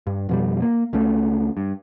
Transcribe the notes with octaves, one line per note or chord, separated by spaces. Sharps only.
G2
F2 B2 G3
A#3
C#2 C#3 A3
G2